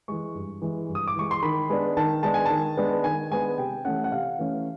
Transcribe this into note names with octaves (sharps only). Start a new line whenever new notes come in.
E3 G#3 C#6
G2
E3 G#3
G2
D#6
D6
E3 G#3 C#6
C6
D#3 B5
G#3 B3 D4
D#3 A5
G#3 B3 D4 A5
G#5
D#3 A5
G#3 B3 D4
D#3 G#5
G#3 B3 D4 G#5
C3 G5
E3 A3 C#4 F#5
F#5
C3 F5
E3 A3 C#4